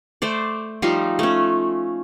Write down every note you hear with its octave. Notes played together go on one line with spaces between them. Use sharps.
A3 C5 D5
F3 G3 D#4 F4
A3 C#4